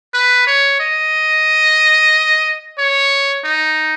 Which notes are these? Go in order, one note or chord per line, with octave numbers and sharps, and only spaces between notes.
B4
C#5
D#5
C#5
D#4